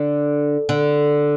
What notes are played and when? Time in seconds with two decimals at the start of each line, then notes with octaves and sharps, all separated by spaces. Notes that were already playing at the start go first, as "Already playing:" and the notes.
Already playing: D3
0.69 D3